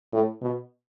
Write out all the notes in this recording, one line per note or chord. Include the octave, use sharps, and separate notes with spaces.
A2
B2